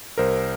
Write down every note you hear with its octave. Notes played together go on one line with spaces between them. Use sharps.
C2 A#4 C5